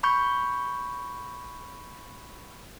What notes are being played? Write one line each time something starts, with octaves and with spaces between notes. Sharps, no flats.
B5 C#6 G6